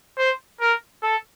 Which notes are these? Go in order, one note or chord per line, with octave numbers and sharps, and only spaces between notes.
C5
A#4
A4